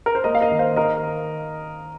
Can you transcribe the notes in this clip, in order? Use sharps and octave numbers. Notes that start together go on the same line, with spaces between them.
A#4
C5
A#3 A#4 D#5
F5
A#4 D#5
D#3
C5 F5
D#3 A#4 D#5